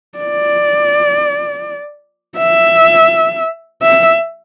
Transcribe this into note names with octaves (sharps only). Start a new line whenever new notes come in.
D5
E5
E5